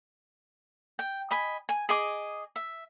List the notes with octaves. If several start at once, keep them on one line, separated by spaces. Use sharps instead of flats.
G5
D#5 G#5 B5
G#5
G#4 D#5 D6
E5